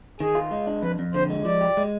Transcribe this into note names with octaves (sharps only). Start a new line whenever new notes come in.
D#3 G#4
F4
G#3
D4
F2 B4
F2
D3 C5
G#3
F3 D5
G4
G#3